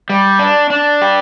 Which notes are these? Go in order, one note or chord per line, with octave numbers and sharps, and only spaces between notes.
G3
D4
D4
G4